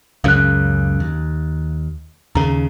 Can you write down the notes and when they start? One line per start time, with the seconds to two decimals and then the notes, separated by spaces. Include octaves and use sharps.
0.24 C#2 F#2 C#3 F5 F#6
1.00 D#2
2.35 D#2 C#3 A#5